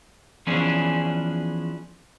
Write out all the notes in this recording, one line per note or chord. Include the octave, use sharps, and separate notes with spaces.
E3 F3 B3 C#4 D4 G#4